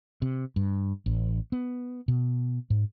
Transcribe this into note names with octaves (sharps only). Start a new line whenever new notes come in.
C3
G2
A1
B3
B2
G#2